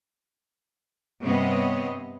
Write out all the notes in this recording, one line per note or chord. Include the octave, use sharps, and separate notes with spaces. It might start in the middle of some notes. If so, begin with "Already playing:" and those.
G2 C3 B3 C4 C#5 D#5